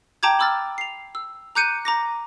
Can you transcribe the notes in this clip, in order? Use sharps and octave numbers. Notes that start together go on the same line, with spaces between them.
G5 A5 A#5 D6 G6 G#6
B5 D6 E6 F6 A6
C7 F7
E6
A#5 D6 F#6 G6 C#7 D#7
A#5 D6 A#6